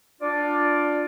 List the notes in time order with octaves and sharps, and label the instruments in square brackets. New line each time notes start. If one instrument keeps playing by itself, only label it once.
[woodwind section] D4 F4 D5